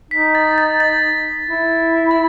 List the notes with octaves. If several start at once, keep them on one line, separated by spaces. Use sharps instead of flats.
D#4 B6
A6
A6
A6
E4
A6